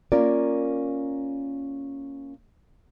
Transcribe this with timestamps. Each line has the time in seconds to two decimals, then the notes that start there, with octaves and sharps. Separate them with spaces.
0.12 A#3 C#4 F4 A#4 D5